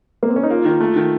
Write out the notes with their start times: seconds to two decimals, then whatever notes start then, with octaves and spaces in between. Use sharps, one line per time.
0.23 A#3
0.29 C4
0.36 C#4
0.43 D#4
0.50 A#3 F4
0.65 D#3
0.80 A3
0.96 D#3